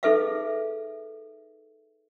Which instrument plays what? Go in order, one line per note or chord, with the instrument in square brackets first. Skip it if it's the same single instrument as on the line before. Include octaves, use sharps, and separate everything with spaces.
[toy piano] D#4 G#4 A4 B4 E5 F5